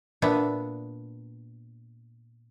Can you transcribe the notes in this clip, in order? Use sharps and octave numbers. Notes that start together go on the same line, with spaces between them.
A#2 B3 D4 E5